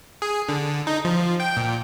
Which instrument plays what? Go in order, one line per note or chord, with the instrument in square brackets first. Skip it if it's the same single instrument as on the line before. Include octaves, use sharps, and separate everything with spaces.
[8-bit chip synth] G#4
D3
D#4
F3
G5
A#2